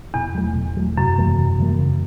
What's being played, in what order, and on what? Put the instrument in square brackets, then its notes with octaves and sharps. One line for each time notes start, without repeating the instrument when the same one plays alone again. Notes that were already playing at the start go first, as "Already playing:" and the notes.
[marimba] E2 [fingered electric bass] B2
[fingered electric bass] F#3 A3
B2
F#3 A3
[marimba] F#2 [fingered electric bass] C3
[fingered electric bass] E3 G3 A#3
C3
E3 G3 A#3
C#3